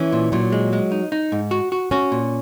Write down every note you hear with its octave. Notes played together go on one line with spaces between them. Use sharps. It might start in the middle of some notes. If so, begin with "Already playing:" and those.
Already playing: E3 C#4
A#2
A#2 F#3
G#3
G#3
D#4
D#4
G#2
F#4
F#4
C#4 F#4
A#2